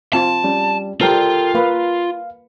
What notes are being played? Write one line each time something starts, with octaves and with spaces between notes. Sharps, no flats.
C4 F4 A5
G3 C#4
G3 F4 A4 A#4 C5 G5
A#3 B4 F5